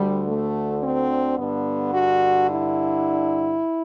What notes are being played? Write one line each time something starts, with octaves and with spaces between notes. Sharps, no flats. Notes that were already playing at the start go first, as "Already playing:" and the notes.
Already playing: D2 D3 G3
A3
C4
G2 D3 B3
F#4
E4